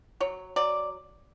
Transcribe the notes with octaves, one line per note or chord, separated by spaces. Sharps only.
F#3 C#5
F#3 D5